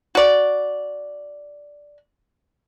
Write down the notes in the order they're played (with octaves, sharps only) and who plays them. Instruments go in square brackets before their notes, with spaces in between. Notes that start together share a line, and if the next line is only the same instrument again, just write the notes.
[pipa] F#4 D5